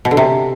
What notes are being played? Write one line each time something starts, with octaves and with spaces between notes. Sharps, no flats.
B2
D3
C3